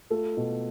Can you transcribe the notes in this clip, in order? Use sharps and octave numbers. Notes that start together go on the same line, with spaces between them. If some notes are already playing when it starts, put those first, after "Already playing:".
A3 F4 A4
B2